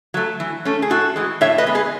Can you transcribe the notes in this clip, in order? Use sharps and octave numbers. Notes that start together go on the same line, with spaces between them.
F#3 A3
E3
A3 C#4
G#4
A2 F#4 A4
E3 G#3
A2 C#5 E5
B4 D#5
G#3 B3
G#4 B4